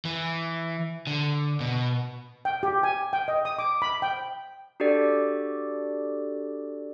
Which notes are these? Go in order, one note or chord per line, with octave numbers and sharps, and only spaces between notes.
E3
D3
B2
G5
G4
G#5
G5
D#5
D#6
D6
B5
G5
D4 F#4 G4 A4 D5